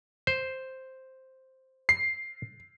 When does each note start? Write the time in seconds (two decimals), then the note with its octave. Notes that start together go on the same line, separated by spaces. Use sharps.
0.27 C5
1.89 C7